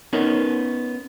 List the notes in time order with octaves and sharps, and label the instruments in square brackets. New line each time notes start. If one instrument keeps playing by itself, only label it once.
[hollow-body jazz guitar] B3 C#4 D#4 A#4